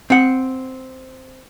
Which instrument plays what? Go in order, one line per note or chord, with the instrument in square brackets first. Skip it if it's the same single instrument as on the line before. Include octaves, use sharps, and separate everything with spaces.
[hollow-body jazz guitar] C4 F#5